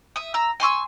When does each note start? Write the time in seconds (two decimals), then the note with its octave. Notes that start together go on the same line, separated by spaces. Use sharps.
0.16 E5 D#6
0.34 A#5 E6
0.60 G#5 C6 C#6 E6